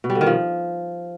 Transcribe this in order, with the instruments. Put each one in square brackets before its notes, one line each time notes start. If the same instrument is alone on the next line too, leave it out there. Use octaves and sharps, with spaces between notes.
[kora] B2
G3
D3
D#3
F3